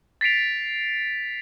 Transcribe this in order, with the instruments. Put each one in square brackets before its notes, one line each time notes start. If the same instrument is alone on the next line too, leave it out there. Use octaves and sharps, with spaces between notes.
[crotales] A6 B6 C7 D7 F7